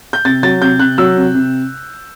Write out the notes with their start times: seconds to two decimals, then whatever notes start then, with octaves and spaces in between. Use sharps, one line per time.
0.13 G6
0.25 C3 A6
0.43 F#3 A6
0.62 C3 G6
0.79 C3 F#6
0.98 F#3 E6
1.17 C3
1.35 C3